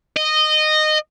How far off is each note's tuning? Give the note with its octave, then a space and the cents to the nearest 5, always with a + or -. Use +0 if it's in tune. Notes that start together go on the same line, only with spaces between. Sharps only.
D#5 -15